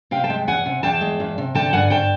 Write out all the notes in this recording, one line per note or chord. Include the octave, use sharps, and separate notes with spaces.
C3 F5 G5
G5 A5
G#3
E2 F#5 G#5
C3
E2 G5 A5
G#3
E2
C3
D3 G5 A5
G2 F#5 G#5
G2 G5 A5